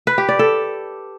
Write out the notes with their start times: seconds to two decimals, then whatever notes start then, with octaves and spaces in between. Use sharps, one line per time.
0.07 B4
0.18 G4
0.29 D5
0.39 A4